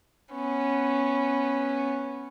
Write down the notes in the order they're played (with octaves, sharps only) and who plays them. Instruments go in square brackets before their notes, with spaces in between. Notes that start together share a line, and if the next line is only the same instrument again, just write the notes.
[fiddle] B3 C#4